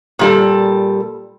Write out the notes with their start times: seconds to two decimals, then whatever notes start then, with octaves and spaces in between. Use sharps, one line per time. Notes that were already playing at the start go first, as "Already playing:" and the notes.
0.19 A#2 G3 A4